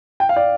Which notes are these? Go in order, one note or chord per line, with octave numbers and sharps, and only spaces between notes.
G5
F5
D5